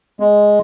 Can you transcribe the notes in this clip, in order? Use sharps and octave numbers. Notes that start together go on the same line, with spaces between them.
G#3